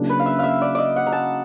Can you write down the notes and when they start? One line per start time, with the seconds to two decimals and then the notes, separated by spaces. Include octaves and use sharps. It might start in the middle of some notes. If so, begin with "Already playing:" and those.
Already playing: C#3 F#3 A#3 D4
0.10 B4
0.20 F5
0.26 E5
0.39 E5 F5
0.62 D5
0.75 D5 D#5
0.96 F#5
1.07 A#5
1.12 A5